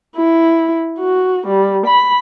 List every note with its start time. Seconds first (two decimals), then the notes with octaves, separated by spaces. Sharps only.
0.16 E4
0.99 F#4
1.47 G3
1.86 B5